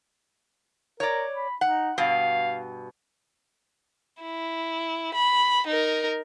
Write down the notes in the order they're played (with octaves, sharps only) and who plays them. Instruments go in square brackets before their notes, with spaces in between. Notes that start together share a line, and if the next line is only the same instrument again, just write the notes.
[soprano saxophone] A#4 [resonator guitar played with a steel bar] C#5 D5
[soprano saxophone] B5
[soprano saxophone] D#4 [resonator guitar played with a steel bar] F#5
[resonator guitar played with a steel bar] G2 B2 [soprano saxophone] F5
[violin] E4
B5
D#4 A#4